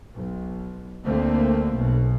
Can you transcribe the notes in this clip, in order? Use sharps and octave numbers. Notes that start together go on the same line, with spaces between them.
B1
D2 D3 A3 A#3 C4
B1 B2